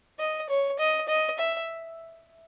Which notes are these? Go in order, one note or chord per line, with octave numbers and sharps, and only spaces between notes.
D#5
C#5
D#5
D#5
E5